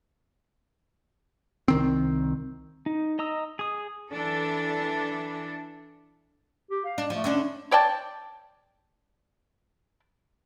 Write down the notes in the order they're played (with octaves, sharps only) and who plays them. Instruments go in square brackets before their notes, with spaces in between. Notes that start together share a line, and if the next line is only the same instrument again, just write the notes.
[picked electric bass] C2 D#3 C4
[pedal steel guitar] D#4
D#5 A#5 D#6 E6
G#4 D#6
[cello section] E3 D4 A4
[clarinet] G4
F5
[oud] D4
[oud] F3 [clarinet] A3
[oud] D3 C#4 D4
[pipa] C#5 D5 G5 A5